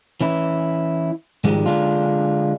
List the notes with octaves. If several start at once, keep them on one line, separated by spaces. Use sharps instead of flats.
E3 C#4 E4
G#2 D#3 F3 G3 G#3
D3 G#3 D4 F4